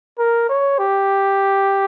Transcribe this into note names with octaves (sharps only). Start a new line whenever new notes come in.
A#4
C#5
G4